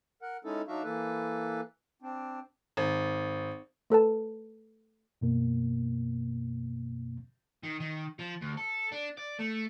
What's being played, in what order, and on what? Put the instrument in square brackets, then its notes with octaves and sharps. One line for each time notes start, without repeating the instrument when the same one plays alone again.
[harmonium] A#4 F#5
G#3 C#4 D#4 E4 A4
F#3 D4 D#4 F#4 E5 F5
E3 A#3 A4 B4
C4 D4
[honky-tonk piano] G#1
[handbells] A3 A4 B4 A5
[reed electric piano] F#2 B2 A#3
[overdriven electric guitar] D#3
D#3
F3
D2
A4
D4
D5
A3